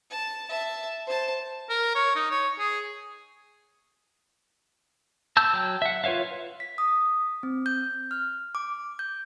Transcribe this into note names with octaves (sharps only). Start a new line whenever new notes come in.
A5
E5 A5
C5 A5
A#4
C#5
D#4
C#5
G#4
A5 E6 G6
F#3 G5
E5 F#5
F4 B4 C#5 E5 F5
B6
D#6
C4
G6
F6
D6
G6